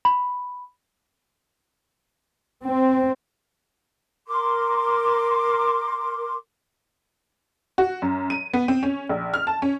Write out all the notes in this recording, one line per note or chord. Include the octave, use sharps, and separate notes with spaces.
B5
C4
A#4 C6 D6
F#4
F#2
D#7
B3
C4
C#4
A#1
F6
A5
C#4